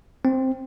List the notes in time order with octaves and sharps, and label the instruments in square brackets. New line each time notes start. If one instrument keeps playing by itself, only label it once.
[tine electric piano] C4